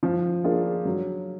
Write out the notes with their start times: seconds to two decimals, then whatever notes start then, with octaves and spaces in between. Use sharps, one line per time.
0.03 F3
0.44 A#3 D4 F4 G#4
0.85 F#3